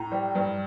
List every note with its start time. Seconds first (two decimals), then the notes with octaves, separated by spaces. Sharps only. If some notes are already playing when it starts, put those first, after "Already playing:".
Already playing: A2 A#5
0.12 G3
0.35 G2